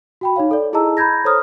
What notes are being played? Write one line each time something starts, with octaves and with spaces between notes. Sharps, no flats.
F#4 G5 B5
D#4 C#5 F5
A4 D5
E4 G#4 D#5 A5 A#5 E6
A#5 B5 G6 G#6 A#6
A4 C5 C#5 A#5 D#6 F6